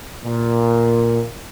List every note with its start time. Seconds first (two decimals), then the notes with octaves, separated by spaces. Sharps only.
0.24 A#2